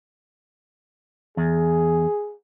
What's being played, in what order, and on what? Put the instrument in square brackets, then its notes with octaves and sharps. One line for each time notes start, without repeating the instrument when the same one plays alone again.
[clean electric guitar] E2 [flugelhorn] G#4